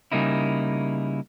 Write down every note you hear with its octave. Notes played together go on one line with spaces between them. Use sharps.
C#3 G3 A#3 D#4 E4